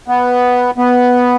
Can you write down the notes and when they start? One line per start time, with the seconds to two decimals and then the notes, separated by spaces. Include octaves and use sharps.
0.08 B3
0.78 B3